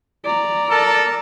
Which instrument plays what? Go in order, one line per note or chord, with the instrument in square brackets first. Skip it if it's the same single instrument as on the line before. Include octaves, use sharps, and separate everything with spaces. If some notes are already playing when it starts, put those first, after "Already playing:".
[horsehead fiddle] D5 A#5
[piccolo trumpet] A4 [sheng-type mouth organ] A#4 A5